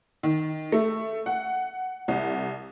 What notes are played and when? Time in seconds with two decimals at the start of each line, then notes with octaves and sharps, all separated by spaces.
0.23 D#3
0.72 A3
1.26 F#5
2.08 C2